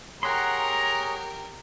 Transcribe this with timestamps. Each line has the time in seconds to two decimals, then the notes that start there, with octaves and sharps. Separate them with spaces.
0.23 G4 G#4 A#4 C#5 F#5 A#5 C6